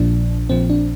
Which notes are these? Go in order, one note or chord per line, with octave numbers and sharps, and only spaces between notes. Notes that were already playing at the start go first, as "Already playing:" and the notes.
Already playing: A#1 A#2 F3 D4
A#1 A#2 F3 C4
D4